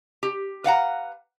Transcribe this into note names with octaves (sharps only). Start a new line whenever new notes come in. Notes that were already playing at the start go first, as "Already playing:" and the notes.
G4
B4 F5 F#5 A#5